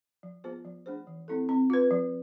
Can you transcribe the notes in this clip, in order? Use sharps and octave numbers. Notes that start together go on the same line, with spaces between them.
F3
B3 F4 G#4 C5
F3
A3 D4 G#4 C5
E3
A3 C4 E4 A4
C4
F4 B4
F3